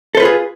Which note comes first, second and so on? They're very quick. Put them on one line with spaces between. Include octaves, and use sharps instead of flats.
A4 C5 B4 F4 G#4